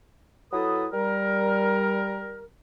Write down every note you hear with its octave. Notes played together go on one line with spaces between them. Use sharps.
F#3 E4 A4 B4 D#6
G3 A#4